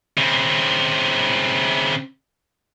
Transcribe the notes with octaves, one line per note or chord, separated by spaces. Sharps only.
C#3 C4